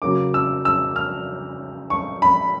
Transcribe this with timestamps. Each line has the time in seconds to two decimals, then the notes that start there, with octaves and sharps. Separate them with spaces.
0.02 C#3 F#3 A#3 D6
0.34 E6
0.65 E6
0.96 F6
1.90 C#6
2.22 B5